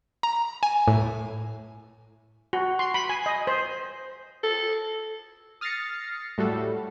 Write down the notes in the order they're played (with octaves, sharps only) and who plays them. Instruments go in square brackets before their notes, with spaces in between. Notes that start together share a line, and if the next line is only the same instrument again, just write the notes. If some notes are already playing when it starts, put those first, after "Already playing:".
[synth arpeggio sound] A#5
G#5
A2
[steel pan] F#4
C6
B5
G#5
D#5
C5
[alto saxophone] A4
[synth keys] D#6 F6 A6 A#6 C7 C#7
A2 G3 F#4 A4